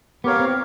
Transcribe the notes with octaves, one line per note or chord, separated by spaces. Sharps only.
B3 G4 A#4 C#5 F5
C4